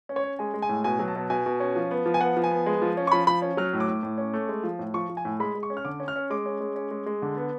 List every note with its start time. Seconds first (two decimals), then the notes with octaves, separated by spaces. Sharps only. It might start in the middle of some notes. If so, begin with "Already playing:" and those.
0.09 C#4
0.16 C#5
0.24 C#4
0.39 G#3 G#5
0.54 G#3
0.62 G#5
0.69 A2
0.84 B2 G#5
0.99 F#3
1.08 A5
1.15 B2
1.30 B2 G#5
1.46 B2
1.60 C#4
1.76 F3
1.91 B3
2.06 F3
2.14 G#5
2.21 B3 F#5
2.37 F3
2.44 G#5
2.51 B3
2.66 G#3
2.82 F3
2.97 C#4
3.07 C#6
3.12 F3 B5
3.27 F3 B5
3.42 C#4
3.57 F#3 F6
3.73 A2
3.80 D6
3.88 A2
4.03 A2
4.18 C#4
4.34 A3
4.49 G#3
4.64 F3
4.79 A2
4.94 F3 C#6
5.10 F3
5.17 G#5
5.25 A2
5.40 G#3 B5
5.55 G#3
5.63 C#6
5.70 C#4
5.77 F6
5.85 D3 D6
6.00 C#4
6.08 F6
6.16 C#4
6.30 G#3 D6
6.46 C#4
6.60 G#3
6.76 C#4
6.91 G#3
7.06 G#3
7.22 D3
7.37 B3